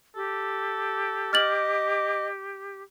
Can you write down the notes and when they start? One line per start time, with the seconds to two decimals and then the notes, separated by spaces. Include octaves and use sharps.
0.16 G4 A4
1.33 D#5 D6 F6 A6 F#7